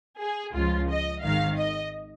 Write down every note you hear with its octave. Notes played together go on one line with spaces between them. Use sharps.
G#4
C#2 C#3 F3 F4
D#5
G#1 G#2 D#3 F5
D#5